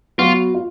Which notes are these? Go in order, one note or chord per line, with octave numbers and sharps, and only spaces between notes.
F#3 B3 F4 F#4
F4